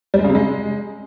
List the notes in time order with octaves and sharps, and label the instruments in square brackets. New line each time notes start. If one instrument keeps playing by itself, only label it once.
[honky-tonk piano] G3
G#3
C#3
C3
G#3